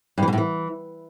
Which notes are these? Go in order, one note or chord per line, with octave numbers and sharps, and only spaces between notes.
G2
E3
B2
A2
E3